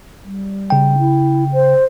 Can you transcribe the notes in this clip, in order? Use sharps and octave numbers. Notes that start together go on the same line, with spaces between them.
G3
C#3 G5
E4
C5